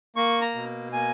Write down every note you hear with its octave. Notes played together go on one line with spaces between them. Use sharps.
A#3 C#6
A#5
B2
A#3 G#5